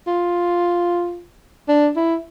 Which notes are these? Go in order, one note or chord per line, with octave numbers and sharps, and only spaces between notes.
F4
D4
E4